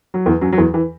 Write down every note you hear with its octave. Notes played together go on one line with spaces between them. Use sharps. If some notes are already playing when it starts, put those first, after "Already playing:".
F#3
E2 E3
F#2 F#3
F#3
E2 E3
E3